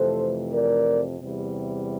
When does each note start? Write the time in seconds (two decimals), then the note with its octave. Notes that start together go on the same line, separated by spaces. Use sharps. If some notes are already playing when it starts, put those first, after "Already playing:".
Already playing: F2 C3 E3 A3 A4 C5
0.52 A#4 D5
1.21 E2 C3 G3